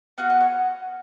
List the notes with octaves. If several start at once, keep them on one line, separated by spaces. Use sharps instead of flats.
B3 F#4 F5
D#5
C#5